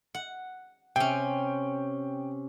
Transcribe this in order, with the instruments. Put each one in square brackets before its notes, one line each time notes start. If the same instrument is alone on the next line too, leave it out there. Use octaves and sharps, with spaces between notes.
[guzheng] F#5
[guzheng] C3 C#4 [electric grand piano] G5